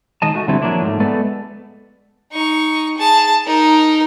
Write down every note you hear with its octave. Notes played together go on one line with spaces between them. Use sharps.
D#3 G#3 D#5 A5
A3 F#4
D3 G3 A3 C4 E4
F3 F#3 A#3 D4 E4
G#2 A3
G#3 A3 B3 A4 B4 D5
D#4 C#6
G#4 A5
D#4 A#4